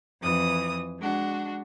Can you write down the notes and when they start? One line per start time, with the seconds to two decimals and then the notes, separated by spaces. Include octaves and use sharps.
0.21 F2 E3 D#6
0.99 G#3 D4 F#4